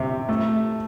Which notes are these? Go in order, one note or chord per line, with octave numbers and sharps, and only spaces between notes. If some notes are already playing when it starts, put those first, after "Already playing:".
Already playing: C3
A3